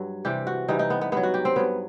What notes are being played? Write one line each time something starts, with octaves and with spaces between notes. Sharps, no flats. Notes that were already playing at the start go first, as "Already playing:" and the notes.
Already playing: G2 F#3
C3 E3 G3 G4
F#4
C3 E3 G3 D#4
D#4
B3
B3
G2 F#3 B3
F#4
G4
C4
G2 F#3 B3